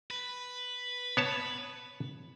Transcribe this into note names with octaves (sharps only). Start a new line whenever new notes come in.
B4
B3 C#5 A5